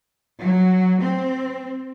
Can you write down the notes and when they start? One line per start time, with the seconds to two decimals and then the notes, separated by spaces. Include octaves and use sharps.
0.41 F#3
1.02 C4